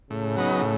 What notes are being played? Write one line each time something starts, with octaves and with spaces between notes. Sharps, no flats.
A2 C#3
F#3 B3 D#4
A2